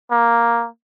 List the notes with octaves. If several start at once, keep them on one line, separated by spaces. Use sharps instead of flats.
A#3